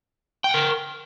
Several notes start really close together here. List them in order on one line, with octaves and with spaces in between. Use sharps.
G5 F#5 A#4